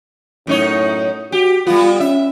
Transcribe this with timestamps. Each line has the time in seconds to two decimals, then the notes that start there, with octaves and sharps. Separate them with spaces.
0.47 F#2 A2 D#4 C#5
1.32 F#4 G4
1.67 G3 B3 F4
2.00 C#4 E5